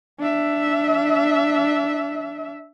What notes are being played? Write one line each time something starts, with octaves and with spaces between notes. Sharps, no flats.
D4 E5